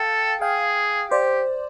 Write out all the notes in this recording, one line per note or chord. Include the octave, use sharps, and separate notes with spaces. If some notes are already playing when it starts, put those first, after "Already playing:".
Already playing: A4 F5 G5
G#4 F5 G5
G4 C5 D5